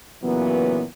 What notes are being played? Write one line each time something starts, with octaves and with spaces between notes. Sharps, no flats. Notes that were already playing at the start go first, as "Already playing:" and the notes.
A#2 C#3 E3 F#3 B3